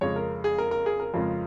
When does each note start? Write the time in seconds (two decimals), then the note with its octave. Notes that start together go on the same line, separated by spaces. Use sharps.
0.01 F2 C#3 G#3 C#5
0.16 A#4
0.44 G#4
0.58 A#4
0.71 A#4
0.86 G#4
1.00 A#4
1.14 F2 C#3 F3 G#3